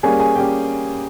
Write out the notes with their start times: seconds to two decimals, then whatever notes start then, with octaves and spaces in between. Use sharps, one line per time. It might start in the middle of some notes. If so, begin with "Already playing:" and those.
0.03 G3 A#3 C#4 G#4 G#5
0.19 G#4 G#5
0.35 G3 A#3 C#4 G4 G5